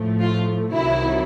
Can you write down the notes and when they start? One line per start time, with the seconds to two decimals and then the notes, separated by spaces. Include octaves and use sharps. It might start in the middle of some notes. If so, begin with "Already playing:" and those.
Already playing: A2 F3 A3
0.21 F4
0.73 C2 C3 D#3 F#3 E4